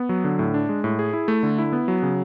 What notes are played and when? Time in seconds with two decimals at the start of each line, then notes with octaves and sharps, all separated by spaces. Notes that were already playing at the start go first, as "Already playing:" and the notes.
Already playing: B3
0.09 F#3
0.24 D3
0.39 A2
0.54 D4
0.69 G#3
0.84 A2
0.99 G#4
1.13 E4
1.28 A3
1.43 D3
1.58 E4
1.73 B3
1.88 F#3
2.03 C#3